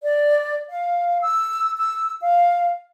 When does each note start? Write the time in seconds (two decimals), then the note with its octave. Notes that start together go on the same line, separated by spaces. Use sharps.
0.02 D5
0.68 F5
1.21 E6
1.76 E6
2.20 F5